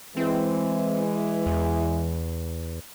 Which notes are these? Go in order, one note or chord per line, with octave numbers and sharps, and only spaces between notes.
E3 G#3 C4
E2